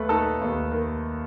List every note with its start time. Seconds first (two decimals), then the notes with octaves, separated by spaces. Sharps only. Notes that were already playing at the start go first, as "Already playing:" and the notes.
Already playing: D#2 A3 B4
0.09 D#4 A4 A5
0.41 D#2
0.72 D#3